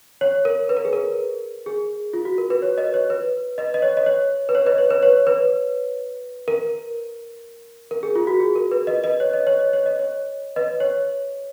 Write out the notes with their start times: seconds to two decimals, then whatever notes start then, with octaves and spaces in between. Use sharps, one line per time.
0.21 C#5
0.45 A#4
0.69 B4
0.77 A#4
0.85 G#4
0.93 A#4
1.66 G#4
2.13 F4
2.25 F#4
2.38 A#4
2.50 B4
2.62 C#5
2.78 B4 D#5
2.94 C#5
3.10 B4
3.58 B4 D#5
3.74 D#5
3.82 C#5
3.97 D#5
4.06 C#5
4.49 B4
4.55 C#5
4.66 B4 D#5
4.78 C#5
4.90 B4
5.03 C#5
5.27 B4
6.48 A#4
7.91 A#4
8.03 G#4
8.15 F4
8.27 F#4
8.40 G#4
8.55 A#4
8.71 B4
8.87 B4 D#5
9.04 B4 D#5
9.20 C#5
9.33 D#5
9.47 C#5
9.59 D#5
9.73 C#5
9.86 D#5
9.99 C#5
10.56 B4 D#5
10.80 C#5